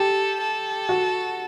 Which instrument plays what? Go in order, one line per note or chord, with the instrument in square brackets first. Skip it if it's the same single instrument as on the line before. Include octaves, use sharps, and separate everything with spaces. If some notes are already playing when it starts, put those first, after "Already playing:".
Already playing: [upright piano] G4 [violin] A4
[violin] A4
[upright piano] F#4